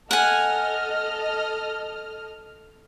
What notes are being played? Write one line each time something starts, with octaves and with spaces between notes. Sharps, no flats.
A4 D#5 F#5 G#5 F6